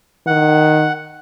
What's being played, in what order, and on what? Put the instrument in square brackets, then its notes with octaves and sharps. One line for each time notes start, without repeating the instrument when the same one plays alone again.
[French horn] D#3 [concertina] F#5